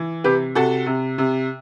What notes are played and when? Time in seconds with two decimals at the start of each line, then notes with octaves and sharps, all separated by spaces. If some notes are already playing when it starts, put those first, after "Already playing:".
Already playing: E3
0.24 C3 G4 B4
0.55 C3 F#4 A4
0.86 C3
1.18 C3